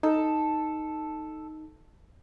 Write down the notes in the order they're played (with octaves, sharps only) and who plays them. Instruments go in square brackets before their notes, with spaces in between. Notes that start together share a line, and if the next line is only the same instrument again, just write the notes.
[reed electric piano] D#4 [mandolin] A4